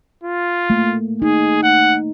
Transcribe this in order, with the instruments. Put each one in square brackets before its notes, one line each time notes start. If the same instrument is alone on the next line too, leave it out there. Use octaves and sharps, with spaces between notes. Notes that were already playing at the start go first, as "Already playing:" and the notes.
[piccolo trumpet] F4
[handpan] A3 A#3
[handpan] D#4 [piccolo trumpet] G#4
[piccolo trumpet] F#5